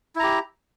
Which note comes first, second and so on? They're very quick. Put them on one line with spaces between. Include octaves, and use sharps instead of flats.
E4 A#5 G4